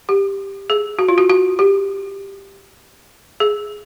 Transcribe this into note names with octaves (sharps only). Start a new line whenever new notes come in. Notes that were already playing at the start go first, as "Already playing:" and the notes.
G4
G#4
F#4
F4
F#4
F#4
G4
G#4